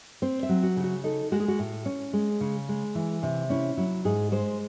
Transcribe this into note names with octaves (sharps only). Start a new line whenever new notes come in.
C4 C5
E5
F#3
F#4
C#3
F#4
D#4 A4
G#3 F#4
G#4
F#4
A2
C#4
G#3
C#3
G#3
E3
C3
C#4 E4
F#3 E4
G#2 G#4
G#3 C5